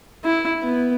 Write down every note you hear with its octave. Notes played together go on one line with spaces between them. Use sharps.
E4
B3